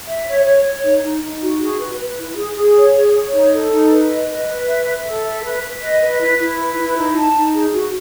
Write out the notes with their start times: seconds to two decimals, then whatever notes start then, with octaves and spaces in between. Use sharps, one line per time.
0.07 E5
0.27 C#5
0.45 C#5
0.65 C#5
0.84 D#4
1.03 D#4
1.22 D#4
1.42 F#4
1.60 G#4
1.80 B4
1.99 B4
2.18 E4
2.37 G#4
2.56 G#4
2.76 C#5
2.95 G#4
3.13 C#5
3.32 D#4
3.52 A4
3.71 D#4
3.91 B4
4.09 D#5
4.29 B4
4.47 B4
4.67 E5
4.86 E5
5.06 A4
5.24 E5
5.44 B4
5.62 B4
5.81 D#5
6.01 B4
6.20 E4
6.39 E4
6.59 B4
6.77 E4
6.97 D#4
7.16 A5
7.35 D#4
7.54 G#4
7.72 F#4